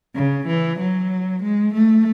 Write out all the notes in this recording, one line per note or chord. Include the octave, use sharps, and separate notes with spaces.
C#3
E3
F#3
G#3
A3